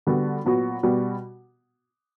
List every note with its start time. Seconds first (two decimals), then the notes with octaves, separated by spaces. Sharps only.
0.07 D3 G3 B3 F#4
0.45 A#2 F#3 B3 F#4
0.83 B2 G3 B3 F#4